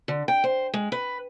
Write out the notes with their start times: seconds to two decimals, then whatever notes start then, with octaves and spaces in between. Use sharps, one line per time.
0.08 D3
0.28 G5
0.44 C5
0.74 G#3
0.92 B4